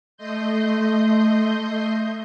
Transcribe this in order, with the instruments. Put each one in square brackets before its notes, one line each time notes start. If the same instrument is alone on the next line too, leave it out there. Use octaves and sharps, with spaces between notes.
[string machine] A3 D#5 C6 G6